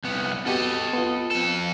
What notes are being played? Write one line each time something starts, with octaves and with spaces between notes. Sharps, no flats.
C2 B3
B3 F#4 G4 A4 D#5
B3 F4
F2 A4